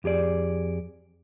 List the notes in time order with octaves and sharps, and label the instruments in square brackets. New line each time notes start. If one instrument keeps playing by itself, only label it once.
[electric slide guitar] F2 G4 G#4 D5